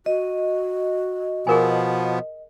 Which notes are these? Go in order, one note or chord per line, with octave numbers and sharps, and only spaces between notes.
F#4 D#5
B2 F3 B3 G#4 A#4 G#5